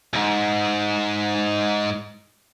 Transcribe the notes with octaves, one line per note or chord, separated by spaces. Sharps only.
C#2 G#2